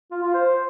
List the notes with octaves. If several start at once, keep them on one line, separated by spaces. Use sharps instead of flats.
F4
F4
C5